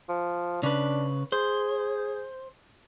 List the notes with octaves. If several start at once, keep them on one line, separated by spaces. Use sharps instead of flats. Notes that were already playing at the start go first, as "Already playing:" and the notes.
F3
C#3 D4 B4
G#4 C5